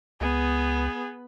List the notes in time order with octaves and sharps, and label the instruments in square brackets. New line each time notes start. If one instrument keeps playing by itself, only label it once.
[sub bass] C#2 [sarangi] B3 [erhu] G#4